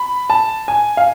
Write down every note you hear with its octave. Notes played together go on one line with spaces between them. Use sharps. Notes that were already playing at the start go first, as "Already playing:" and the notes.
Already playing: B5
A5
G#5
F5